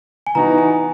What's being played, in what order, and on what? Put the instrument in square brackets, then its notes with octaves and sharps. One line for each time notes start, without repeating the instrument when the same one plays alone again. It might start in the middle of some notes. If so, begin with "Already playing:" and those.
[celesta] G#5
[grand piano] E3 B3 D#4 F#4 [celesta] A#5
[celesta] G#5